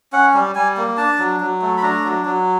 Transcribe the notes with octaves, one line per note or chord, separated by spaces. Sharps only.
C#4 F#5
G3
G3 G#5
A#3
D4 A5
F#3
F#3
A3
B5
D4 A#5
F#3
F#3